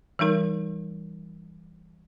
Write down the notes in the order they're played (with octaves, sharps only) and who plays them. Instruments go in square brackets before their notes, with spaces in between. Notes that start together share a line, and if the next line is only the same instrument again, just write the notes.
[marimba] E3 G3 D#4 A#4